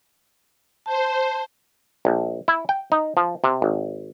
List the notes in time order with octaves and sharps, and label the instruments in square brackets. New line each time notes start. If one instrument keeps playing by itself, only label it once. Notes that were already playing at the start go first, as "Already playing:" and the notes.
[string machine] C5 [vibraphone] A5
[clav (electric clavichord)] A#1
E4
G5
D#4
F3
C3
G#1